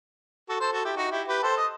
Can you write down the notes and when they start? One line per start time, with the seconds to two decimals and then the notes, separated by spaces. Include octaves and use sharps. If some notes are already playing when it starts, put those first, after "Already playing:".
0.49 F#4 A4
0.60 A4 C5
0.72 F#4 A4
0.85 E4 G4
0.97 D#4 F#4
1.11 E4 G4
1.28 G4 B4
1.43 A4 C5
1.57 D#5